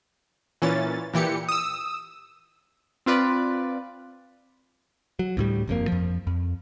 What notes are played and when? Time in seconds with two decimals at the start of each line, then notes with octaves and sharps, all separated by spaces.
0.62 A#2 E3 C#4 A6
1.14 A#2 E3 G4 C#7
1.49 D#6 E6
3.06 C4 F4 B4 D5
5.19 F#3
5.37 D2 A2 G3
5.68 G1 F2 B2 A#3
5.88 F2 F3
6.27 F2